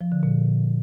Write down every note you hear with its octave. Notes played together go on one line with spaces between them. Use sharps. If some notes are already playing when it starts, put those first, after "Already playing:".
F3
D3
A#2